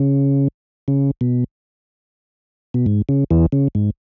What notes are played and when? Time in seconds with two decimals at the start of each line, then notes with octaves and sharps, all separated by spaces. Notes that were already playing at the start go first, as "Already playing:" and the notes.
Already playing: C#3
0.88 C#3
1.21 B2
2.74 B2
2.86 G#2
3.09 C#3
3.31 E2 E3
3.52 C#3
3.75 G#2